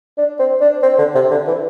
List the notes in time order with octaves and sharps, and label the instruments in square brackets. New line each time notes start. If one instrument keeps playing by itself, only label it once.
[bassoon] D4
C4
D4
C4
D3
C3
D3
E3